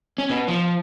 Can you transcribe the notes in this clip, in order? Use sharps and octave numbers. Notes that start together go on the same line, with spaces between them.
C#4
B2
F3